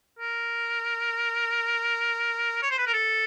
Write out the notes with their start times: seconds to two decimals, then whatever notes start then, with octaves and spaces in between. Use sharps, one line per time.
0.19 A#4
2.62 C#5
2.71 C5
2.78 B4
2.86 A#4
2.93 A4